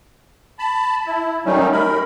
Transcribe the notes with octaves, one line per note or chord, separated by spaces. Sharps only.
A5 B5
E4
D#3 F#3 G3 A3 C#4 D#4
A#4 B5